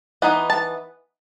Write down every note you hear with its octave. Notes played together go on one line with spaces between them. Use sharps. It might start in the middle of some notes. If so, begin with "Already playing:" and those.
E3 B3 D#4 F#5
A5